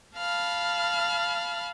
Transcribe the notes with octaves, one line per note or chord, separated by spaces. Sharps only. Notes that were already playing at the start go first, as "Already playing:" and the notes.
F5 A5 B5 F6